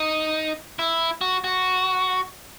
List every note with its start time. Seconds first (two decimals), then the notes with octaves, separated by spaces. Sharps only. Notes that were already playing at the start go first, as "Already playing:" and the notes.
Already playing: D#4
0.79 E4
1.21 F#4
1.44 F#4